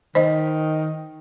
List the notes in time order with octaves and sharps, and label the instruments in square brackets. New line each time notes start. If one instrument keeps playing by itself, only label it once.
[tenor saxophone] D#3 [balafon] C5 D#5